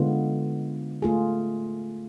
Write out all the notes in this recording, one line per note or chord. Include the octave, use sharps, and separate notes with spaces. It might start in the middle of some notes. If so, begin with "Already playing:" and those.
Already playing: D3 G#3 B3 F4
A3 F4 G#4